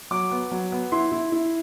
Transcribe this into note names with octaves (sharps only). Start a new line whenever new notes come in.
F#3 D6
B3
F#3
B3
E4 C6
E4
E4